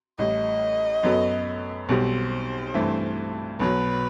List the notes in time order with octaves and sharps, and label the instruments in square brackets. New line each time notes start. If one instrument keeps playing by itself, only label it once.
[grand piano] A1 A2 G3 [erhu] D#5
[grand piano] F#2 F#3 B3 F#4 A4
[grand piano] B1 B2 G3 C4 [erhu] C5
[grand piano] G2 E3 A3 C4
[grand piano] B1 B2 F#3 [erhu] B4